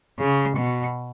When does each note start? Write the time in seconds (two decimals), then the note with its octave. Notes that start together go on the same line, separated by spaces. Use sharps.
0.19 C#3
0.57 B2